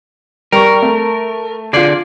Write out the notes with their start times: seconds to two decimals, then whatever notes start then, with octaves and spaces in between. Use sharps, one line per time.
0.52 G3 A#4 C#6
0.82 A3
1.73 D3 F4 G#4 D5 D6